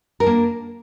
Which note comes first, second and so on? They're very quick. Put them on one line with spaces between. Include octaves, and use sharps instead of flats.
A#4 D4 A#3